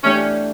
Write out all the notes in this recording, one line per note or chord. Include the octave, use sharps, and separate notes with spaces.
E3 A3 C#4 D4 G4